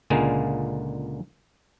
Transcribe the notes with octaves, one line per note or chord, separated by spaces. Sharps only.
C#2 A#2 D3 G#3 A#3 G#4